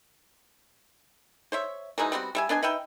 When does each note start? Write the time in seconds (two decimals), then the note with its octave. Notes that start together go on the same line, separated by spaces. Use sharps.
1.52 C5 C#5 E5
1.98 E3 F#3 G#3 D#4
2.12 G3 B3 C4 F#4
2.35 G3 E5 G#5
2.49 B3 D4 D#5 G#5
2.63 D#4 B4 E5 G5